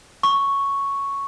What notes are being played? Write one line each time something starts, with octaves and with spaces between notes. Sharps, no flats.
C#6